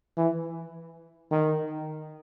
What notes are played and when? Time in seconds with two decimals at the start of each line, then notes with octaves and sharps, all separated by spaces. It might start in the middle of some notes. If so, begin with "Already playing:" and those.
0.17 E3
1.31 D#3